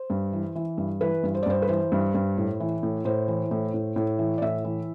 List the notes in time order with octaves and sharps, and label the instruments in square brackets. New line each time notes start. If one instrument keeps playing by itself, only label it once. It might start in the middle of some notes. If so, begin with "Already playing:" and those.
Already playing: [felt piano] C5
G2
E3
E3
G2
E3 B4
G2
C5
D5
G2 C5
B4
E3 C5
G2
G2
A2
E3
A2
A2 C5
E3
A2
A2
A2
E3
D5
A2 E5
E3